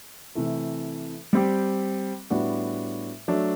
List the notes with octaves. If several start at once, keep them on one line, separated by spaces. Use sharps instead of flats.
C3 E3 A3
G3 C4 G4
A2 G3 B3 D4 F#4
F#3 A3 D4